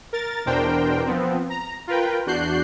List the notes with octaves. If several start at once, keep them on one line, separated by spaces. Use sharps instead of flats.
A#4 A6
E2 B2 D4 A#4 C5 G5
F3 B3 C4
A#5
F4 A#4 B4 G5
E2 D4 F#4 F#6 G6 C7